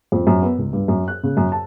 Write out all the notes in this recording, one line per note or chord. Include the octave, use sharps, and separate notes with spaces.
F2
F#2
B3
C#2
G2
F#2
F#6
C#3
F#2
A5